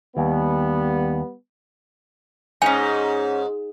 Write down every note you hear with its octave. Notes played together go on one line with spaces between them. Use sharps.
D#2 G3 B3
G#2 C#4 D#4 G#5